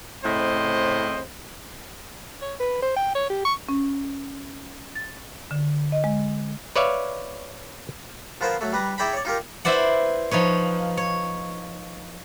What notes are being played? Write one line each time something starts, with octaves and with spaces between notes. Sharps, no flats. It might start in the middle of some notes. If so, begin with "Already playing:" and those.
A2 C#3 C4 E4 C5 D#5
C#5
B4
C5
G5
C#5
G4
C#6
C#4
A6
D3
D#5
G#3
B4 C#5 D5 E5 F5
F3 B3 F4 A#4 C5
F#3 A3
G3 B4 A#5
E4 G#4 D5 G5 A#5 B5
C#5 D5
D#4 F4 G4 A#4
E4 B4 C5 D5 F#5
F3 D#4 B4 C#5
C#5